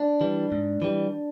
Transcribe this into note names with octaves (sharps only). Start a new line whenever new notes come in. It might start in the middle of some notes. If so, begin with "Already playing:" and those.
Already playing: D4
E3 G3
G#2
E3 G3